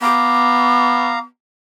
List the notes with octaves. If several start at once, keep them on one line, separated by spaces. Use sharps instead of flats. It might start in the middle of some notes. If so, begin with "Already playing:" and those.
B3 F5 A#5 D6